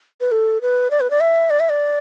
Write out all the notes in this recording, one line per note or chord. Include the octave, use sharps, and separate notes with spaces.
B4
A4
B4
D5
B4
D5
E5
D5
E5
D5